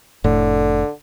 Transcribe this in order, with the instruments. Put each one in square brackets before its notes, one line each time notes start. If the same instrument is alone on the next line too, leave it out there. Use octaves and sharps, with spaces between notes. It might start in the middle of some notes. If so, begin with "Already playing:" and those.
[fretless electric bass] F1 A2 [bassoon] D3